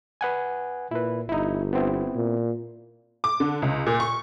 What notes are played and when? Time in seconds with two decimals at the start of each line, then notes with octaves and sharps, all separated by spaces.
0.21 B4 F#5 G#5
0.91 A#2 E4 B4
1.29 G1 D#4 E4
1.73 B3 C4 E4
2.16 A#2
3.24 D6
3.40 D3
3.62 C#2
3.87 A#2
4.00 C#6